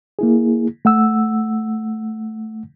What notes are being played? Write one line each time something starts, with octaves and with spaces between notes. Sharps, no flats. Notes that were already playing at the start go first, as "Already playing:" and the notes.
A#3 E4 G#4
A3 F#5 E6